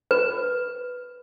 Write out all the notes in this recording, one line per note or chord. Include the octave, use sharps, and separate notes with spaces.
B4